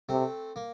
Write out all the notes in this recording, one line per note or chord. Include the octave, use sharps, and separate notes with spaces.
C3 A3 C4
A#3